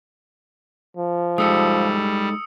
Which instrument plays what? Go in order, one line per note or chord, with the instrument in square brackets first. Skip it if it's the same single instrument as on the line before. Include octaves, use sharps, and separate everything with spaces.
[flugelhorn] F3
[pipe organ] G3 [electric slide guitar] G#3 D#4 A4 [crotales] D#6 E6 C#7